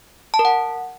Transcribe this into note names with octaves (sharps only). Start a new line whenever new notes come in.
A5
A#4
F#5